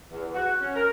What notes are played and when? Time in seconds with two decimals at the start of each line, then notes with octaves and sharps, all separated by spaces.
0.10 E2
0.34 F#4
0.61 C#4
0.75 A#4